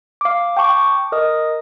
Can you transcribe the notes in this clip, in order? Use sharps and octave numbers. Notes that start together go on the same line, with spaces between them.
F5 D6
G5 A5 C#6 D6
A#4 D#5 D#6